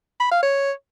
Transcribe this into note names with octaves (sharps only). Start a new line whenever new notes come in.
B5
F5
C#5